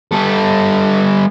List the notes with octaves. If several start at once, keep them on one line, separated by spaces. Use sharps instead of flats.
G3 A4